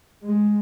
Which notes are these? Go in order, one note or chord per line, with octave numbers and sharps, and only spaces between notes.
G#3